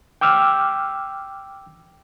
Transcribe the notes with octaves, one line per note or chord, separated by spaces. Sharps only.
G5 D6 E6 F6